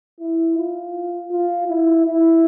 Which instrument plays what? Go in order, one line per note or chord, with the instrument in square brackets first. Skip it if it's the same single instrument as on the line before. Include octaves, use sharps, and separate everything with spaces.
[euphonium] E4
F4
F4
E4
E4